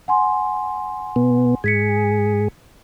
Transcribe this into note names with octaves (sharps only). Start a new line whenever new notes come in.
F#5 G#5 C6
B2 B3
G#2 G#4 G#6 B6 C#7